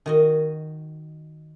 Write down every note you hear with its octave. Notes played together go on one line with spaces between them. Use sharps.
D#3 F#4 D#5